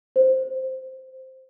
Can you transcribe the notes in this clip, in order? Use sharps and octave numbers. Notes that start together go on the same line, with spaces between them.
C5